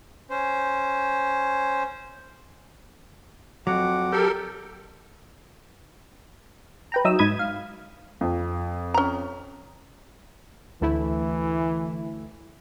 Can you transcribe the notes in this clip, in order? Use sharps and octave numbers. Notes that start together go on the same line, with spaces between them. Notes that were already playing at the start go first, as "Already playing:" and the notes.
C#4 C5
F2 F#3 F#5 D6
G4 A4 A#4
B4 G5 A#5
F#3 D#4 E5 D#6 E6
G#2 B5 D#6 G#6 D#7
F5
F2
C#4 A#5
D2 E3 A3 E4